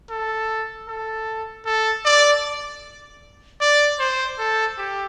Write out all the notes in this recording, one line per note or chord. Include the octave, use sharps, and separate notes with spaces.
A4
A4
A4
D5
D5
C5
A4
G4